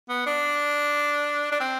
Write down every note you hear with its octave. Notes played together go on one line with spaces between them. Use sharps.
B3
D4
D4
C4